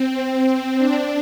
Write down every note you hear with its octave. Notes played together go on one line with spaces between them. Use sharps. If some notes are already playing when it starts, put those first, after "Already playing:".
Already playing: C4
D4